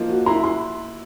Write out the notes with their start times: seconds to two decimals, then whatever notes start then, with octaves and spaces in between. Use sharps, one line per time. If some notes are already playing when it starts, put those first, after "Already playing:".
Already playing: F3 A#3 D#4
0.09 F#4
0.26 E4 A#5 C6
0.43 C6